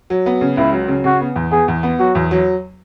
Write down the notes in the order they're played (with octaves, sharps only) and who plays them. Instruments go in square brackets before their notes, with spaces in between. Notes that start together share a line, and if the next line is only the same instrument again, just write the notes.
[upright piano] F#3
B3
C#3
[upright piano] C#2 [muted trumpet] E4
[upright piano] F#3
C#3
[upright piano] C#3 [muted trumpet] F#4
[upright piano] B3
E2
[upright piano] B3 [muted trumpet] G#4
[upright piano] E2
B3
[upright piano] F#3 [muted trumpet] F#4
[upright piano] E2
F#3